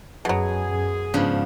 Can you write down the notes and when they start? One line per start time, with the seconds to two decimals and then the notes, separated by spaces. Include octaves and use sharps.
0.25 F#2 B2 F#3 G#4
0.67 F#2
1.14 G#2 C#3 F3 B3 D4